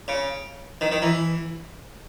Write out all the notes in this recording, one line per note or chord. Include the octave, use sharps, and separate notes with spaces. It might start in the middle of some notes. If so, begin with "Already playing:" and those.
C#3
D#3
D#3
E3